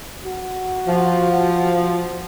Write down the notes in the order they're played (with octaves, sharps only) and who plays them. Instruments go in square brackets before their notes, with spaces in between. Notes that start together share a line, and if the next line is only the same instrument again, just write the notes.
[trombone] F#4
[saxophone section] F3